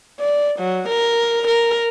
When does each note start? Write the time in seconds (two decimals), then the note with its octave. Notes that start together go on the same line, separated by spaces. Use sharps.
0.20 D5
0.59 F#3
0.89 A#4
1.48 A#4